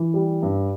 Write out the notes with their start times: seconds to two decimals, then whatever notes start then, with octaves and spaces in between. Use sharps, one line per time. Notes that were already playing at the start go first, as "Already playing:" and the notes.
Already playing: E3
0.14 G3
0.42 G2